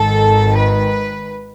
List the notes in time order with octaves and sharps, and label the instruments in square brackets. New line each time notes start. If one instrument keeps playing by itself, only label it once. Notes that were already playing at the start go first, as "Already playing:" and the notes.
Already playing: [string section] G#1 G#2 D#3 A4
B4